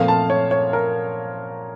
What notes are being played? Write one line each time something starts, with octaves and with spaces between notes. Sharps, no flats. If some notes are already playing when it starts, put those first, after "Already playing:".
Already playing: A#2 F3 A3 C4 F5
A5
C#5
C#5
A#4